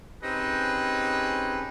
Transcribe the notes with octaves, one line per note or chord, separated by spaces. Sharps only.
C4 C#4 D#4 G4 G#4 B4